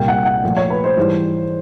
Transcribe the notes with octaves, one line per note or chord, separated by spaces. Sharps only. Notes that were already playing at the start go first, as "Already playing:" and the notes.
Already playing: C2 A#2 G3 A#3 G5
F#5
F#5
A#2 F3 A3
C#5
B4
C5
G#2 E3 G3